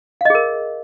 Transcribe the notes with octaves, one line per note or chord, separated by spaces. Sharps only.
G#4 A#4 D#5 F5